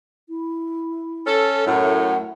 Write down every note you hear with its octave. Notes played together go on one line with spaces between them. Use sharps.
E4
C#4 A4
F#2 A2 F#5